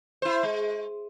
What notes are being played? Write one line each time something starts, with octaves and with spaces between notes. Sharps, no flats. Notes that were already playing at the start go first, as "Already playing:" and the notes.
E4 C5
G#3